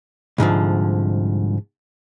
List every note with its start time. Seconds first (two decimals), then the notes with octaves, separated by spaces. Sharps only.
0.38 C2 G#2 D3 F3